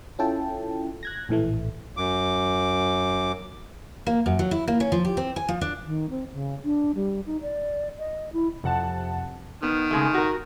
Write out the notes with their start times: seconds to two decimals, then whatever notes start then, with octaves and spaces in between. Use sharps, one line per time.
0.19 C#4 E4 F4 A4 G5 A5
1.03 F#6 G#6 A#6
1.29 A#1 A2 E3 A3
1.97 F#2 D6
4.07 A#3
4.26 F#2
4.39 F#3
4.51 E4
4.68 A#3
4.80 C#4
4.92 F3
5.05 G4
5.17 C4
5.36 G#5
5.48 F3
5.61 D4
5.86 D#3
6.10 C4
6.33 C#3
6.65 D4
6.95 G3
7.26 D#4
7.42 D5
7.98 D#5
8.33 E4
8.63 F2 C3 F#5 A5
9.63 D#3 B3
9.91 C#3 G#3 A3
10.14 F#4 A#4